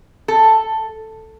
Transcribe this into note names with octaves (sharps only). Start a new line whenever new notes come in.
A4